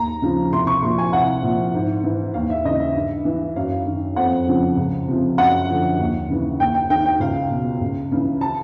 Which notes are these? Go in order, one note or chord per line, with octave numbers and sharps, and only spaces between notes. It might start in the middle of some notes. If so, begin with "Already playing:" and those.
Already playing: D#2 A#5
C#3 F3
C2 C6
C#6
A#2 F3 C6
G#5
C2 F#5
A#2
F3
G#2
E3
D#2 F5
E5
C#3 E3 D#5
E5
G2
E3
F#2 F5
D#3
F2 F#5
C#3 F3
C#2
C3 F3
F#2 F#5
D3 F3
D#2
C#3 E3
D#2 G5
G5
D#3 G5
G5
C#2 F5
B2
C#2
C#3 E3
A5